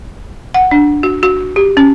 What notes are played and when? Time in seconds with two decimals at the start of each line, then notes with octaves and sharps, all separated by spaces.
0.54 F#5
0.71 D4
1.03 F#4
1.23 F#4
1.56 G4
1.77 C#4